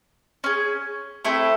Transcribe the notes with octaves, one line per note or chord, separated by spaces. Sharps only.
C#4 G#4
A3 C4 E4 A4